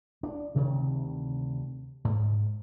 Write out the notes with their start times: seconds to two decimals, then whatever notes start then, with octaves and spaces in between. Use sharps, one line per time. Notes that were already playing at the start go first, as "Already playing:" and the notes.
0.23 D4
0.55 D2 C3 D#3
2.05 G#2